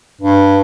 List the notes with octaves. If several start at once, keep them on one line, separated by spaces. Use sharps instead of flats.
G2